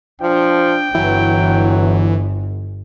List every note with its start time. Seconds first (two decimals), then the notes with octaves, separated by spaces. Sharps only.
0.22 F3 D4 G5
0.95 G1 E3 F#3